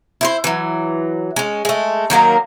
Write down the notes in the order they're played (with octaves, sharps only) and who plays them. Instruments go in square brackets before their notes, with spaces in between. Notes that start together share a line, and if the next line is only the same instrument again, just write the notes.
[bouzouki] E4 G4 C5
E3 F#3
G#3 C#4
G#3 A3
D#3 F#3 A#3 A#4